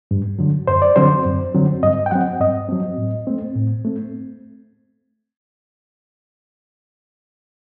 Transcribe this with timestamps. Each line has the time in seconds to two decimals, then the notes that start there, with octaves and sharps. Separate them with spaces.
0.11 G2
0.39 D3 F#3
0.68 F#2 C5
0.82 D5
0.96 D3 F#3 C4 C5
1.26 F#2
1.55 D3 F#3 C4
1.83 G2 D#5
2.06 G5
2.11 F#3 C4 F#5
2.40 G2 D#5
2.69 F#3 C4
2.97 A2
3.27 A3 C4
3.56 A2
3.85 A3 C4